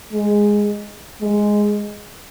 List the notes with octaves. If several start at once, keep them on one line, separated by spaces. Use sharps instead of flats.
G#3
G#3